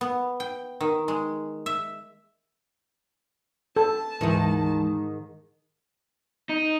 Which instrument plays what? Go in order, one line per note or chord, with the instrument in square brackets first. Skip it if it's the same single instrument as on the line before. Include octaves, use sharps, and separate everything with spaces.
[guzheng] B3
G5
D#3
G#3
E5
[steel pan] A4 [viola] A5
[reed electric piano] D2 E3 G#3 [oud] G#2 D#3
[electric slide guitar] D#4